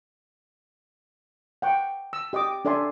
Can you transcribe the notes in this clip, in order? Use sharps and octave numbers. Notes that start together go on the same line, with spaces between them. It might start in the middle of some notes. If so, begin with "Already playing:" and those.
F#5 G5 C#6
E6
G4 D#5 G5 D6 D#6
D4 A4 D5 E5 G#5 C6